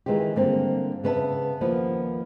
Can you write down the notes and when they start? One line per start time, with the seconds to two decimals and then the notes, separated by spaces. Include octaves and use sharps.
0.06 D#3 E3 G#3 F4 G4
0.36 G2 D3 A#3 C4
1.04 C#3 B3 B4 E5 A5
1.61 D#2 F3 A#3 B3